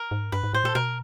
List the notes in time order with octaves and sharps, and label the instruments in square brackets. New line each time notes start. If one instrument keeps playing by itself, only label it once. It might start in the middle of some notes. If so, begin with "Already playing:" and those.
Already playing: [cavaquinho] A#4
[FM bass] G#2
[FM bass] G2 [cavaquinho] B4
[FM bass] G#2
[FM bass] A2 [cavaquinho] C5
[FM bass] A#2 [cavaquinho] A4
[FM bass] B2 [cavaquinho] A#4